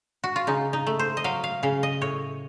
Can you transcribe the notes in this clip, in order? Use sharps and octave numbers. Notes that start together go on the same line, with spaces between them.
F#4
F4
C#3 D#4
D#4
A3
C5
D#5
F#3 F5
F5
C#3 F5
D#5
A2 C#5